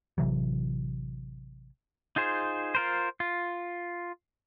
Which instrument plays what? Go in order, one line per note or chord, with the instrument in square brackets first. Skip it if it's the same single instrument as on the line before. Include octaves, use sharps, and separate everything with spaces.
[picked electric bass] A1 C3 E3 F#3
[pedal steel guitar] D#4 F4 G#4 C5
F4 A#4 C5
F4